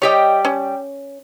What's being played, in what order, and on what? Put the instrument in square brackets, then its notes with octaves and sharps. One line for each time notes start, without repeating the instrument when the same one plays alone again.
[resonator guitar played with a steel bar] G3 G4 G5 [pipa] C#5 D#5
[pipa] C#4